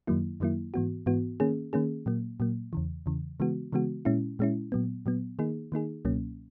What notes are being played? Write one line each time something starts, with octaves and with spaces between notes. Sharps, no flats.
F#2 D#3 F#3 A#3 E4
F#2 D#3 F#3 A#3 E4
G#2 E3 B3 F#4
G#2 E3 B3 F#4
D#3 A#3 C#4 G#4
D#3 A#3 C#4 G#4
A#2 F#3 A#3
A#2 F#3 A#3
E2 C#3 E3
E2 C#3 E3
C#3 E3 G#3 B3 F#4
C#3 E3 G#3 B3 F#4
A#2 G#3 C#4 E4
A#2 G#3 C#4 E4
A#2 F#3 B3
A#2 F#3 B3
D#3 A#3 D#4 G#4
D#3 A#3 D#4 G#4
C#2 B2 F#3 A#3 C#4